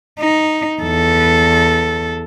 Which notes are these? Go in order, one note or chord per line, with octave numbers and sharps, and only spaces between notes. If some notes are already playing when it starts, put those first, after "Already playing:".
D#4
E2 A4